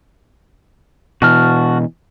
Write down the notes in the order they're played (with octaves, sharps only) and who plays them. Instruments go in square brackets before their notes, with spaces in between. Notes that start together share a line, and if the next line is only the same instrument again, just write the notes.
[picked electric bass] B2 E3 [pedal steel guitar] F#4 A5 F6